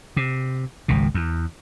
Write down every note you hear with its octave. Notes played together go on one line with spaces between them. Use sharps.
C3
G#1 C#2 B2
E2